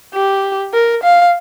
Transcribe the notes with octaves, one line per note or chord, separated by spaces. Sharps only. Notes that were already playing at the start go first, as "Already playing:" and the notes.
G4
A#4
F5